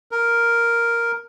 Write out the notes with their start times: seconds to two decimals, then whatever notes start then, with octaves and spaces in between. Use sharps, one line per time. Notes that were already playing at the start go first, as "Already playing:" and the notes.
0.11 A#4